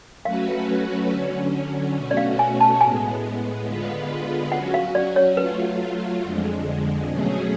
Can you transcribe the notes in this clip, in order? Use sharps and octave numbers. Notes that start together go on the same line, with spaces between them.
F#3 A3 C#4 F#4 B4 F5
D3 F#3 C#4
B2 A3 C#4 F#4
D5
F5
G#5
A5
A2 G#3 B3 G#5
D3 G#3 B3 F4 B4
F#3 C#4 F#4 F#5
F5
D5
C#5
F#3 A3 F4 B4
F2 D3 G#3
B2 F#3 A3 C#4 G#4